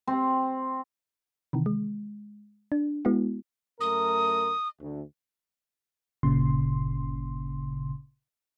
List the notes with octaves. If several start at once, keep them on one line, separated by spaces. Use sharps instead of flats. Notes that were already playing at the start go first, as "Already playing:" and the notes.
C4
C3 D#3 E3
G#3
D4
G#3 B3 E4 F#4
F#2 A3 A#4 D#6
D2
G1 A#2 C#3 C6